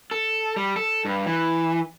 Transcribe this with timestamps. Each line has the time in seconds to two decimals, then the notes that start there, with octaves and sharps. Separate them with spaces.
0.11 A4
0.56 G3
0.76 A4
1.05 G2
1.26 E3